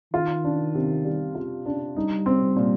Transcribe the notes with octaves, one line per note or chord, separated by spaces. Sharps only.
D#3 F4
D4
C3
G3
F4
D4
G3 D#4
C4
A#2